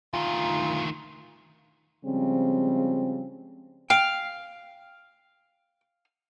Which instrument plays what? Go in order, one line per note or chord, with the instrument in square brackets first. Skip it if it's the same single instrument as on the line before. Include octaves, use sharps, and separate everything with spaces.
[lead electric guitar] D2 D#3 [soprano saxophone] F4
[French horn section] C#3 F3 G3 G#3 C4
[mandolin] F5 [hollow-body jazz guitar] G5